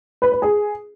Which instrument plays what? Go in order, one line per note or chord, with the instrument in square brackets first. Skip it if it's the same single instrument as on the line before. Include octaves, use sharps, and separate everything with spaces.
[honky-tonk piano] B4
B4
G#4